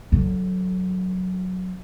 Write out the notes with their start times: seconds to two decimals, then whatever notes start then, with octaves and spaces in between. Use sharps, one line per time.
0.12 D3 F#3